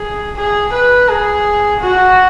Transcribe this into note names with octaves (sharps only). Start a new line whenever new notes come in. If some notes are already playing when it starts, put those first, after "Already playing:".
Already playing: G#4
G#4
B4
G#4
F#4